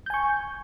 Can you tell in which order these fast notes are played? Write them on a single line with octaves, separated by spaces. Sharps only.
G6 G#5 C#6